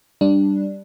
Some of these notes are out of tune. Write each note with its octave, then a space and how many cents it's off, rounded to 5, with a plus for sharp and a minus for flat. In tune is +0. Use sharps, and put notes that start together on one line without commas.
G3 +0 D4 +0